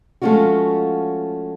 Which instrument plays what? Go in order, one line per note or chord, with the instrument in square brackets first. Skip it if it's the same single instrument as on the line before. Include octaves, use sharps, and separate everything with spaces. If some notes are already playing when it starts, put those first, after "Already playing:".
[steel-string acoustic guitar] F3 G#3 A3 C#4 F4 F#4